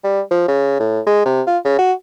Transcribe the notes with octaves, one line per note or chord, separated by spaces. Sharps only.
G3
F3
C#3
A2
G#3
C3
F4
C#3
F#4